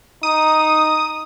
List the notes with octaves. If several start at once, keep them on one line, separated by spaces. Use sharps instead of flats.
D#4 D#6